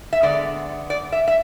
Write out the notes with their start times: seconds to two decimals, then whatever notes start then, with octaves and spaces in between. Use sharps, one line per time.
0.13 E5
0.22 D3 G#3 B3 D5
0.90 D5
1.12 E5
1.28 E5